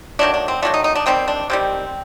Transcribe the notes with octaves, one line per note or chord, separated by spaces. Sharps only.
D#3 F#3 A3 D4
D4
C4
D#3 F#3 A3 D4
D#4
D#4
D4
C3 D#3 G3 C4
D4
C3 D#3 G3 C4